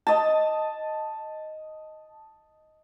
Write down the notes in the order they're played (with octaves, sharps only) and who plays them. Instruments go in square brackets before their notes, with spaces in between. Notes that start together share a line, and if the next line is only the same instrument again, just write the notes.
[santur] D#5 A5